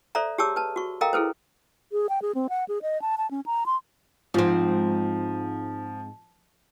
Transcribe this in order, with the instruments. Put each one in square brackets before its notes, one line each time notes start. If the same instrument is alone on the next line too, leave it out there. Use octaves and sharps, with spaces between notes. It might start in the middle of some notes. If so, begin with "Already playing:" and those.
[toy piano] A4 C5 D5 E5 A#5
G4 G#4 C#5 A5 D6 E6
B4 A5
F#4 C#6
A4 A#4 D#5 F5 G5 A#5
E4 G#4 A4 B4 C5
[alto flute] G#4
G5
G#4
C4
F#5
G#4
D#5
A5
A5
C#4
A#5
C6
[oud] G#2 C4 [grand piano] F3